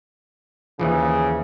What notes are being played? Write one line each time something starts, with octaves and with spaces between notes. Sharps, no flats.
D#2 C#3 E3 F3